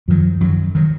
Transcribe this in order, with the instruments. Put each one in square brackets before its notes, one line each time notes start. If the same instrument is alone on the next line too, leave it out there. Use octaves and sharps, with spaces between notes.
[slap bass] F#2 D#3 F#3 [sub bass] F3
[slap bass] F#2 D#3 F#3
D#3 F#3